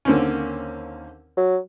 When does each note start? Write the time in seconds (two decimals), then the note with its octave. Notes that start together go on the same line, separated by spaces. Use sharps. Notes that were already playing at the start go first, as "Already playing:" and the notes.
0.05 D#2 D3 A#3 C4 C#4
1.37 F#3